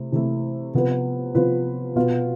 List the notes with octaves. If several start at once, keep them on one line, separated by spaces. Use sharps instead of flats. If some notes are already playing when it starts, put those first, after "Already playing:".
Already playing: C3 A3 E4
C3 E3 A3 E4
C3 F3 B3 F4 B4
C3 F3 B3 F4 B4
B2 B3 F4 B4 F5